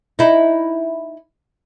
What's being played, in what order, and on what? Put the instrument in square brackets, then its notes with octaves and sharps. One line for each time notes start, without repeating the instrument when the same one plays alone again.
[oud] D#4 E4